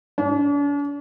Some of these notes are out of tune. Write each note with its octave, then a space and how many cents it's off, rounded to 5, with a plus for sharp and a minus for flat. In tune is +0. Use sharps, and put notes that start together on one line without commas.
D4 -45